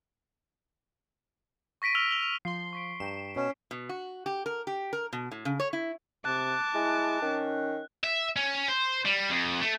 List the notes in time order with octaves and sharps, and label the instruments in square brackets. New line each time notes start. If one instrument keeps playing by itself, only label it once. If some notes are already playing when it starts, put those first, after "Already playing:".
[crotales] C#6 A#6 B6 D7 D#7
E6 F6 A#6 F7 G7
F7 G7
F7
[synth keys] F3 C6 [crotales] C7 G7
[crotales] C#6 B6 D7
[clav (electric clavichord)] G2 G5 A#5 [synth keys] E7
[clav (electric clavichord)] B2 [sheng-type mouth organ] C#4
[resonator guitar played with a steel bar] B2
F#4
G4
A#4
G4
A#4
B2
A2
C#3
C#5
E4
[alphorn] C3 [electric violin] A5 D6 [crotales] F#6
[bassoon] G#3 [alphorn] E4
[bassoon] D#3 [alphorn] C#4
[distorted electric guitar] E5
C#4
C5
G3
F2
A3